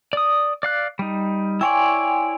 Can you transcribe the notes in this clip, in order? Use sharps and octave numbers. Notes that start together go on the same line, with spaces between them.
D5 D#6
D5 F5 F#6
G3 D#4
E4 C#5 D5 G5 G#5 C6